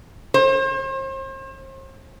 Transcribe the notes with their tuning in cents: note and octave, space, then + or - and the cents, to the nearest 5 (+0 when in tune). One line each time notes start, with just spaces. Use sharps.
C5 +40